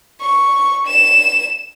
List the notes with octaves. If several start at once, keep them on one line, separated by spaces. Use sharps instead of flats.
C#6
E7